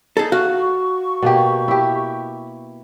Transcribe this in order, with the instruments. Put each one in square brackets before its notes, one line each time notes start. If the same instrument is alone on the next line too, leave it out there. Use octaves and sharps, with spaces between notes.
[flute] D#4 [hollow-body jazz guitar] G#4 A4
[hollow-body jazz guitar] F#4 F5 [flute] C#6
[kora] B2 A#3 G4
E4 G4